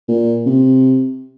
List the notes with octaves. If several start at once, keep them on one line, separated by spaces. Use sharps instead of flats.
A#2
C3